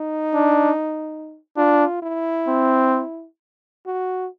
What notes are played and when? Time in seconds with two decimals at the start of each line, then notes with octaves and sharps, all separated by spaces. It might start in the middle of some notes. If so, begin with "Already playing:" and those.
Already playing: D#4
0.34 D4
1.57 D4 F4
2.02 E4
2.48 C4
3.86 F#4